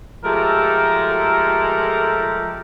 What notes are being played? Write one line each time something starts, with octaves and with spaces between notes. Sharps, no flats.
F3 G#3 A3 G4 A4 A#4